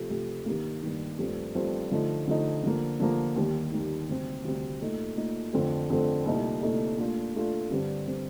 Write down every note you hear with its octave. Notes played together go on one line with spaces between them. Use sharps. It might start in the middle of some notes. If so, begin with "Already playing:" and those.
Already playing: C3 F3 A3
C3 F3 A3
G2 D#3 G3 A#3
G2 D#3 G3 A#3
G2 F3 A3 C4
G2 F3 A3 C4
D3 F3 A3 D#4
D3 F3 A3 D#4
D3 F3 A#3
D3 F3 A#3
D#2 D#3 G3 A#3
D#2 D#3 G3 A#3
D2 C3 G3 C4
D2 C3 G3 C4
A#2 A3 D#4
A#2 A3 D#4
F2 D3 A3 C4
F2 D3 A3 C4
C2 A#2 A3 D#4
C2 A#2 A3 D#4
A#2 A3 D4 F4
A#2 A3 D4 F4
G2 D3 G3 C4
D3 G3 C4